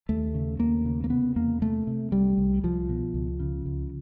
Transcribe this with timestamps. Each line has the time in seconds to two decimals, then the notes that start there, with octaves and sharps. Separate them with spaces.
0.09 D#2 A3
0.34 C#3
0.60 D#2 A#3
0.86 C#3
1.04 A#3
1.10 C3 B3
1.36 E2 A#3
1.61 C3 A3
1.87 C3
2.12 C2 G3
2.38 C2
2.63 C2 F3
2.89 B2
3.14 C#2
3.40 C#3
3.66 C#2